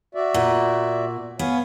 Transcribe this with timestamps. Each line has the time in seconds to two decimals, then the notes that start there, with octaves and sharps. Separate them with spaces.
0.15 F#4 D5 E5
0.34 A#2 F#5
1.39 B3 C#5 F5 G#5